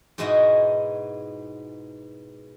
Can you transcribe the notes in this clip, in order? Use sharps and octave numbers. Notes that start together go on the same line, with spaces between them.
G#2 B2 G#3 D#4 E4 F#4